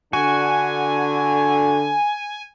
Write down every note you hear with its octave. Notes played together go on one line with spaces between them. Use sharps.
D3 F#4 G#5